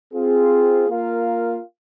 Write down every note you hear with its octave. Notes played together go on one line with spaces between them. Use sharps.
C4 F4 G#4
A#3 F4 A#4 F5